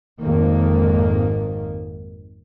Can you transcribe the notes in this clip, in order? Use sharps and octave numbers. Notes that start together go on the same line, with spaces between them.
G#1 F2 G#2 D#3 A#3